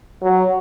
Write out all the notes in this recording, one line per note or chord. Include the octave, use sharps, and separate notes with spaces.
F#3